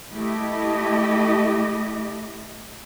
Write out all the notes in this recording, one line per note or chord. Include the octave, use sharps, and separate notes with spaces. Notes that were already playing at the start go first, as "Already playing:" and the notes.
A3 E4 G4 D#5